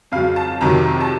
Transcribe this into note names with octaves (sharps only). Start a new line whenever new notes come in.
F2 C#3 F#3 F5
A5
F2 C3 D#3 F#3 A#5
A5